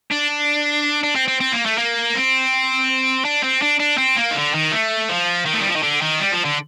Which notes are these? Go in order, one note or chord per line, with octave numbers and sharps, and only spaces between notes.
D4
D4
C4
C4
C4
A#3
A3
A#3
C4
D4
C4
D4
D4
C4
A#3
D#3
D3
D#3
A3
F3
D#3
A3
G3
F3
D#3
D3
D#3
G3
F3
D3